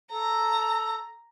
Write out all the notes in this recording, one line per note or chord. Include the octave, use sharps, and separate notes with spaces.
A4 A#5